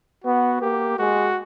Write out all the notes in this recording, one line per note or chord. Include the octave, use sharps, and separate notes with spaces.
B3 F#4
A#3 G4
G#3 F#4